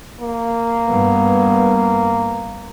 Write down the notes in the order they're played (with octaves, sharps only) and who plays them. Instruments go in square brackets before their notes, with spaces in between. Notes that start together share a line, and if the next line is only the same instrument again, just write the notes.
[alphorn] A#3
[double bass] G2 B3